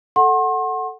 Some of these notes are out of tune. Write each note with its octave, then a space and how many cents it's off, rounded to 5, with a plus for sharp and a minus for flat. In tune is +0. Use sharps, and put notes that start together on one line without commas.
A4 +0 F#5 +0 C6 +40